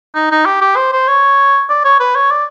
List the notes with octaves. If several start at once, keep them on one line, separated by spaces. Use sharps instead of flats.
D#4
D#4
G4
G4
C5
C5
C#5
D5
C#5
B4
C#5
D5